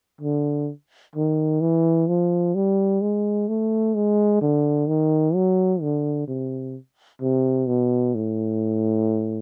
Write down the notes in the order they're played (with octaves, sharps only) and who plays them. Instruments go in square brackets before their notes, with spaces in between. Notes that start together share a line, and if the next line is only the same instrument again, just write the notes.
[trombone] D3
D#3
E3
F3
G3
G#3
A3
G#3
D3
D#3
F#3
D3
C3
C3
B2
A2